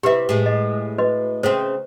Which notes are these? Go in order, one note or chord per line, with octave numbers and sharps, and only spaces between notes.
C3 E4 G4 B4 E5
A2 G#3
D#5
F#4 B4 D#5
C#3 A3 C4 C5